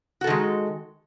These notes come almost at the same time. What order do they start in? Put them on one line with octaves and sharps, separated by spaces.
F#4 A4 D#3 G#3